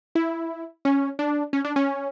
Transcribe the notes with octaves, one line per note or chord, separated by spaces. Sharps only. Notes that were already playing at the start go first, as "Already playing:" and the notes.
E4
C#4
D4
C#4
D4
C#4